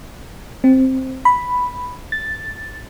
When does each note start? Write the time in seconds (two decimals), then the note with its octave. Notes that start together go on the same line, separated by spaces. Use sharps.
0.64 C4
1.25 B5
2.12 A6